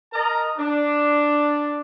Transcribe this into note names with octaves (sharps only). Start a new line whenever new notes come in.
A#4 D#5 A5 A#5
D4